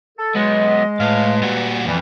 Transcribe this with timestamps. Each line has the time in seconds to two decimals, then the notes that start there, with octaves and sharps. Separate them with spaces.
0.18 A4
0.35 F#3 G#3 B3 D#5
1.00 A2 B4 F5
1.42 A#2 G3 F#4
1.86 F2 E3 G3